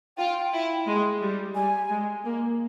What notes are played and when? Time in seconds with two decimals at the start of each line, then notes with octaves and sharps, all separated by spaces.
0.17 F4 G5
0.53 E4
0.87 G#3
1.21 G3
1.55 G3 G#5
1.90 G#3
2.24 A#3